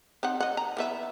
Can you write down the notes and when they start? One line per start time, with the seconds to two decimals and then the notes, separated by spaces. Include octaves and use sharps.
0.23 C4 D#4 F#5
0.40 D#5 F#5
0.57 A#5
0.77 E3 B3 E5